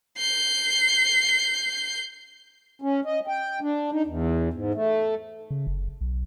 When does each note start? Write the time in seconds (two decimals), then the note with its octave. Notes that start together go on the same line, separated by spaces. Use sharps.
0.18 G6 C7
2.82 C#4
3.05 D#5
3.27 G5
3.61 D4
3.92 D#4
4.06 E2
4.54 G#2
4.74 A3
5.50 C#3
5.67 F#1
6.01 B1